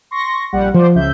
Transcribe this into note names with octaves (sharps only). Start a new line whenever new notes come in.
C6 C#6 A#6
A#1 G3 F#5
F3 C5 D5
C#2 E5 G6